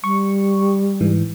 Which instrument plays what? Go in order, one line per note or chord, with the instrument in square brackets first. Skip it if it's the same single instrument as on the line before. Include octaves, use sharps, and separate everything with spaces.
[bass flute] G3 [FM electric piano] C#6
[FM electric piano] G#2 E3